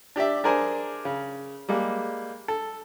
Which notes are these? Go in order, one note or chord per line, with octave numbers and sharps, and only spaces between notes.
D4 G4 D5 E5
D4 G#4 A#4 C5 G#5
C#3
G3 G#3 A#3
A4